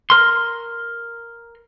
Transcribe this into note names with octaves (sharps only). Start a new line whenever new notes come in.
A#4 C6